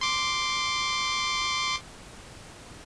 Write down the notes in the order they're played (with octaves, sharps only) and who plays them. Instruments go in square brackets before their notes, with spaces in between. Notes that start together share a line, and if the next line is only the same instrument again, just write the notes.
[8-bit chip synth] C6 D6